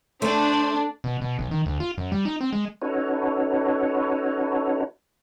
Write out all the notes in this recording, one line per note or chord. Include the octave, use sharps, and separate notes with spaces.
A3 D4 C5
B2
B2
B1
D#3
D2
F4
F#2
G3
D#4
C4
G#3
C#4 D#4 F#4 A4 B4 C#5